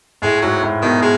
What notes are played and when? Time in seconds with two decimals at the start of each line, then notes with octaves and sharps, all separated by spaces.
0.22 A2 G#3
0.42 G#2 F#3
0.62 A2
0.82 B2 D#3
1.02 G#3